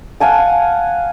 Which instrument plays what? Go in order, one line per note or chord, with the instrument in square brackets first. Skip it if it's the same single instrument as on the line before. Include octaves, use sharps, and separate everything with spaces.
[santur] F5 F#5 G#5 A5